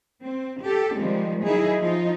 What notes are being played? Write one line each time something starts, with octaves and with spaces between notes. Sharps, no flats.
C4
G4 A4
D#3 F3 G3 G#3 C4
D#3 F#3 D#4 E4 G#4
F3 D#4 F4